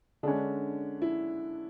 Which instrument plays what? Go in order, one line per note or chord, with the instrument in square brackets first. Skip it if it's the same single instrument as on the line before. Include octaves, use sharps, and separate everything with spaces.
[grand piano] D3 G#3 C#4 [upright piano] D4
[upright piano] E4